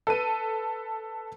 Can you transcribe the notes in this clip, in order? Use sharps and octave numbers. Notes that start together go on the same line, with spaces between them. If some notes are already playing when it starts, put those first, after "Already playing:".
A4 B4 D#7